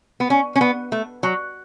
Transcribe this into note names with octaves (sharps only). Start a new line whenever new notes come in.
B3
C#4
C#4
B3
A3
F#3